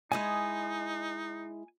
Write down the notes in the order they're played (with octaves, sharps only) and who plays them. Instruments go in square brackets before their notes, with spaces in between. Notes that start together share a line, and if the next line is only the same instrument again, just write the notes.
[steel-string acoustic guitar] G#3 E4 D#5 [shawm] D#4 [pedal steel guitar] G#5 D#6